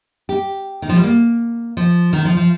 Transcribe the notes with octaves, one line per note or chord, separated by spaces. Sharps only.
G4
D#3
F3
G3
A#3
F3
D#3
F3
F3